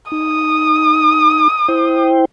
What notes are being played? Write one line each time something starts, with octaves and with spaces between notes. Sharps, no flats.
D#4 D#6
E4 C5 G5